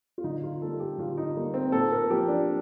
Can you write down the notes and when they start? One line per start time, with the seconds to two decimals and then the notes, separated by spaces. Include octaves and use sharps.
0.18 F4
0.24 D3 D#4
0.37 D#4
0.44 F4
0.62 G3 A#3 A4
0.80 G4
0.98 D3 F4
1.17 D#4
1.36 G3 A#3
1.54 C4
1.72 A#2 A4
1.92 A#4
2.10 F3 A#3 G4
2.28 D4